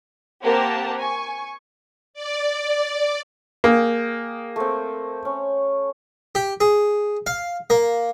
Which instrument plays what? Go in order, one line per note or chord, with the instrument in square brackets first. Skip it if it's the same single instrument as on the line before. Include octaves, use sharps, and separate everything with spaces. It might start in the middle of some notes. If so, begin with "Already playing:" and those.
[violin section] A#3 C4 G4 A#4 F#5 A5
G#5 C#6
[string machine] D5
[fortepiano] A#3 [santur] G#4 G5
[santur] A3 C4
C#4
[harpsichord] G4
G#4
F5
A#3